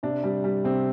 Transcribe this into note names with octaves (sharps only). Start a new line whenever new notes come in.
C3 D4
G3
G3
C3 C4